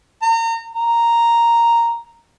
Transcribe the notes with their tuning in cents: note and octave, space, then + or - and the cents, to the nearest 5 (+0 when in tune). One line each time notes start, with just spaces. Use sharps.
A#5 -35
A#5 +0